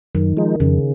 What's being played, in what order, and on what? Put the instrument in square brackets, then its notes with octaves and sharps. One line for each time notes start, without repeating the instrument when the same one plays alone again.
[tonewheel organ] F#2 [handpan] D#3
[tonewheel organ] F3 G#3 D#4
[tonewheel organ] F2 [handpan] C#3